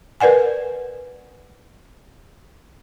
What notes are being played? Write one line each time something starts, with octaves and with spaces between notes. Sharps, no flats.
A#4 B4 D5 F#5 G#5